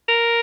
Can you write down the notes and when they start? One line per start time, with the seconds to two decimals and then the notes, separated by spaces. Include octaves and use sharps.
0.08 A#4